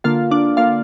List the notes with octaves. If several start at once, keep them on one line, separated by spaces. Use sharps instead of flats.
D3 A#3 F4 F5
D4 D5
D3 A#3 F4 F5